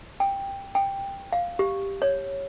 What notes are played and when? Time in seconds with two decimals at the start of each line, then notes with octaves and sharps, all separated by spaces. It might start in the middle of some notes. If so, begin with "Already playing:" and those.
0.20 G5
0.75 G5
1.33 F5
1.59 G4
2.02 C#5